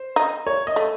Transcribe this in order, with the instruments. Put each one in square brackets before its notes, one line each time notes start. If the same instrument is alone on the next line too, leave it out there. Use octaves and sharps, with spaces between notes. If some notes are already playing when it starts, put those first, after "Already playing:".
Already playing: [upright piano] C5
[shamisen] D#4
[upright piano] C#5
D#5
[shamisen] A3